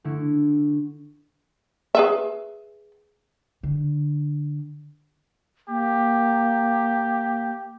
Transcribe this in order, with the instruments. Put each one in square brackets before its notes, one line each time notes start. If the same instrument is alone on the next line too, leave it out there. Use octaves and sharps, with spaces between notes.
[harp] D3 A3 E4
[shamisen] G#4 B4 E5
[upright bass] D3
[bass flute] A#3 [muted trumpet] G4